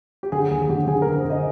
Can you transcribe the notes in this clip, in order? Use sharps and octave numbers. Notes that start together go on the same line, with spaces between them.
G4
D3 G#4
D#2 G#4
D3 G4
D3 G#4
A#4
D3
C5
D3
D#5